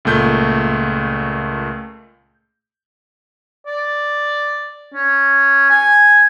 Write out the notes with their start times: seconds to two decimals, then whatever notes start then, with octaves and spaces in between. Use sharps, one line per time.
0.05 C#2 A#2 A3 G6
3.67 D5
4.94 C#4
5.70 G#5